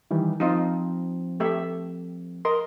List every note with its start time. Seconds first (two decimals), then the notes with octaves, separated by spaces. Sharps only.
0.11 D#3 E3 G3
0.40 F3 C4 D#4 F4 D#5
1.40 A3 G4 E5
2.45 A#4 D#5 C6